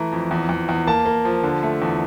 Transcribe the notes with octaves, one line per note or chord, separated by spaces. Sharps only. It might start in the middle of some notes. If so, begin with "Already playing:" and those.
Already playing: E3 A3 A#5
F2
E2
E2
E2
A#3 A5
A#3
F3
D3
A3
E2